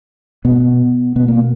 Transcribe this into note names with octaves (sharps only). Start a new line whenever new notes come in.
B2 B3
B2 B3
A#3